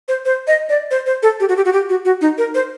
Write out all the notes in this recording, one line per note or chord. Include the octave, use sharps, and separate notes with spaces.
C5
C5
D#5
D5
C5
C5
A4
G4
F#4
G4
F#4
G4
F#4
F#4
D#4
A#4
C5